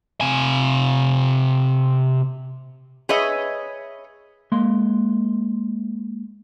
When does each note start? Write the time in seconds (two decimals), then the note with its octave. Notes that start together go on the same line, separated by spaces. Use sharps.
0.21 C3 G#5
3.09 G#4 B4 C#5 D#5 E5
4.52 G#3 A#3 C6